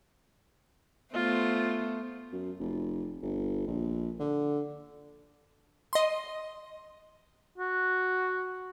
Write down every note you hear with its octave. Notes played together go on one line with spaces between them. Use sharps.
A3 B3 F4 C5
F#2
F1
G1
A#1
D3
D#5 C6
F#4